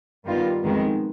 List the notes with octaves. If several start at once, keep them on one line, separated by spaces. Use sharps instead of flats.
G2 D#3 G3 B3 F4
F2 D#3 G#3 B3